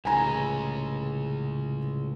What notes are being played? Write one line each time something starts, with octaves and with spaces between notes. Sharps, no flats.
C2 A2 C#3 E3 G#3 G#5 A#5